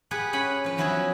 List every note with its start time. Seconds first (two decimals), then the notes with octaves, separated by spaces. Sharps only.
0.11 G4 G#4 B4 F#5
0.33 C#4 B4 F#5 G#5 B5
0.64 F3 B4
0.77 E2 F3 F#3 E4 F#4 G#4